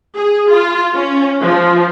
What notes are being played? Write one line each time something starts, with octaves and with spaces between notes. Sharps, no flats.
G#4
F4
C#4
F3